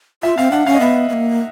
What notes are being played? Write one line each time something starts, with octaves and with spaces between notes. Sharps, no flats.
F4 E5
C4 F5
D4 F#5
C#4 F5
D#5
B3 E5
B3
A#3